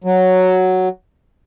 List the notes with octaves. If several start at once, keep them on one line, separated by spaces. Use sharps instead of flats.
F#3